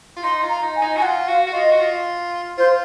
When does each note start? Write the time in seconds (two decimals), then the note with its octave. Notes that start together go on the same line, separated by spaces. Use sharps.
0.17 F4
0.23 D#4 C6
0.43 F4
0.49 A#5
0.63 D#4
0.76 G#5
0.82 D#4
0.97 F#4 G#5
1.02 F4 F#5
1.28 F#4 F5
1.47 F#4
1.53 F4 D#5
1.71 F#4
1.80 F4
2.58 F4 C5